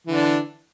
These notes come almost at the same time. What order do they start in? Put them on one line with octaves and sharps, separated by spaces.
E3 D3 D4